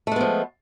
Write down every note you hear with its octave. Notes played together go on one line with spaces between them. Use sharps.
F3 G#3 A3 B3